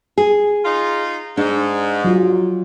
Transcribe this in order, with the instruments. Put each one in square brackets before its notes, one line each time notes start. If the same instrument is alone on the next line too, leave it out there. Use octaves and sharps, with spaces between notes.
[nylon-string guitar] G#4
[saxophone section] D#4 F4
[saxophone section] G#2 [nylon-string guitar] D4
[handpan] F#3 F4